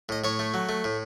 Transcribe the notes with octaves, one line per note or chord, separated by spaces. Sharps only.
A2 D#5
A2 C#5
A3
F#3
A3
A2